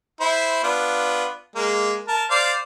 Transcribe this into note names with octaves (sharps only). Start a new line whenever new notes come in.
E4 C5
B3 D4 F4
G#3 A#3
A#4 A5
C5 D5 F5